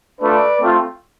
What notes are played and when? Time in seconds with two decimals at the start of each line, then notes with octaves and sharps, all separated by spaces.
0.21 A3 D4 F4 B4 D5
0.60 A3 C4 F4